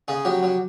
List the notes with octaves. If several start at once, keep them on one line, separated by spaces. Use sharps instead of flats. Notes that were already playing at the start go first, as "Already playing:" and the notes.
C#3 G#4
F#3 G4
F#3